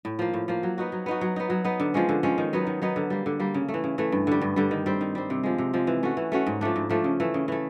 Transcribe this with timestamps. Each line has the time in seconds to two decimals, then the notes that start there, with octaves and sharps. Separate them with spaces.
0.05 A2
0.19 F3 A#3
0.33 A2
0.48 F3 A#3
0.63 F#3
0.78 B3 D#4 F#4
0.92 F#3
1.06 B3 D#4 F#4
1.21 F#3
1.36 B3 D#4
1.50 F#3
1.64 B3 D#4
1.80 D3
1.94 F3 G#3 C#4
2.09 D3
2.23 F3 G#3 C#4
2.38 D#3
2.53 F#3 B3 D#4
2.67 D#3
2.82 F#3 B3 D#4
2.96 D3
3.10 G3 A#3
3.26 D3
3.39 G3 A#3
3.54 C#3
3.68 A3
3.74 E3
3.84 C#3
3.98 E3 A3
4.12 G2
4.27 D3 G3
4.41 G2
4.56 D3 G3
4.71 D#3
4.86 G3 C4
5.01 D#3
5.15 G3 C4
5.30 C3
5.43 F3 G#3
5.58 C3
5.74 F3 G#3
5.87 E3
6.03 A3 C#4 F#4
6.17 E3
6.32 A3 C#4 F#4
6.47 G#2
6.61 F3 A3 D4
6.76 G#2
6.90 F3 A3 D4
7.04 C#3
7.20 E3 A3
7.34 C#3
7.48 E3 A3